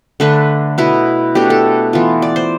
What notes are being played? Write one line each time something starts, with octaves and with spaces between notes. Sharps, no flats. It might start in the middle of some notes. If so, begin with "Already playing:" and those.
D3 A3 D4 B4
B2 B3 E4 B4
B2 A3 D4 G4
A4
E3 B3 F4
D5
C5